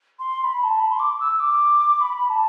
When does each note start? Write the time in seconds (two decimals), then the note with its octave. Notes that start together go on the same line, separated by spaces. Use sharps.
0.19 C6
0.39 C6
0.44 B5
0.60 B5
0.63 A5
0.80 B5
0.91 C6
0.99 D6
1.20 E6
1.39 D6
2.00 B5
2.30 A5